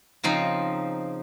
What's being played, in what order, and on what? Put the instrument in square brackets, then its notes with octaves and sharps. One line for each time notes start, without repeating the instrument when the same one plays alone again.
[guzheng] C#3 F3 C4 D#4 A#5